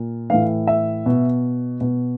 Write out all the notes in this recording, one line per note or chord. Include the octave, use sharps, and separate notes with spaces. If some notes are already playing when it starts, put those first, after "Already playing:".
Already playing: A#2
A2 E3 F5
E5
B2
B2